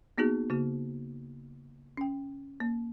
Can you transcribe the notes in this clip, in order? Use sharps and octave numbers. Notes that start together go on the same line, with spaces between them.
A#3 B3 D#4 F#4 G#4
C#3 A#3 F#4
C#4 G5
A#3